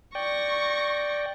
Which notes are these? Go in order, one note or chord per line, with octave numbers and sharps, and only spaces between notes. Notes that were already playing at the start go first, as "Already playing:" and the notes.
D5 G5 C#6 A#6